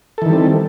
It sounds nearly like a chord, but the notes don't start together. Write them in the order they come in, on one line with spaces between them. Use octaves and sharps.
A4 E3 D#3 G3 C4